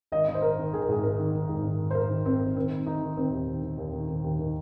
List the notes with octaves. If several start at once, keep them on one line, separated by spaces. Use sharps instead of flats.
G#1 D#5
D#3 D#5
C5
G#1 A#4
D#3
G#1 G#4
A#4
G#2 G#4
G#1 A#4
D#3
D#3
G#2
D#3
G#1
C5
G#2 A#4
D#3
G#1 C4
G#1
D#3 C4
D#3
D#3 D#4
D#3
D#3 C4
D#2
D#3
D#3
D#2
D#3
D#3
D#2
D#3